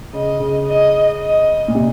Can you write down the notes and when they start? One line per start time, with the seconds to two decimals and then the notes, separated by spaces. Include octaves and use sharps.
0.13 C#3 D#5
0.40 C#3
0.67 D#5
1.21 D#5
1.68 A#2
1.75 C3